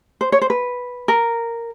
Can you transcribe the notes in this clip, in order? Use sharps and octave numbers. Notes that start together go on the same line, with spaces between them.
C5
C#5
C5
B4
A#4